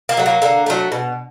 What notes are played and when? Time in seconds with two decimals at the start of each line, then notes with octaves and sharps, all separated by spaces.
0.09 A#3
0.17 F#3 A3
0.26 A#3
0.42 D3 A#3
0.66 F#3 A3
0.92 B2